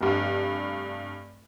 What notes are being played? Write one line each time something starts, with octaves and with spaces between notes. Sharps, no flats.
F1 G2